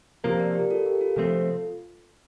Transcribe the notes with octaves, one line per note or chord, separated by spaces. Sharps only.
C3 F3 A#3 G4 A#4
A#4 D5
G4 A#4
F4 A4
G4 A#4
F4 A4
C3 F3 A3 C4 F4 A4